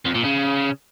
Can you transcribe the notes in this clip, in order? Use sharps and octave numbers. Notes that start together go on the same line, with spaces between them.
F2
A#2
C#3